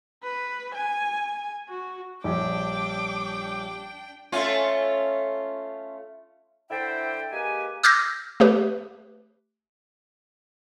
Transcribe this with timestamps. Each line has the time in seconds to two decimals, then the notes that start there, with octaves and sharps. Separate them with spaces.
0.23 B4
0.75 G#5
1.68 F#4
2.24 A#1 G3 D4 G4 C#5 G5 D6
4.32 A3 C#4 F4
6.70 D3 E4 C5 D5 E5 G5
7.32 G#3 A#3 G4 B4 G#5
7.83 D6 E6 F6 G6 G#6 A#6
8.40 A3 G4 B4